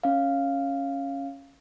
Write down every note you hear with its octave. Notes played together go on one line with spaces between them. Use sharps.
C#4 F5